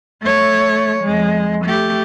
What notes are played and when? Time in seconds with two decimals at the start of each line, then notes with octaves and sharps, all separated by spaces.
0.22 A3 C#5
1.03 F2 G#3
1.65 A3 G4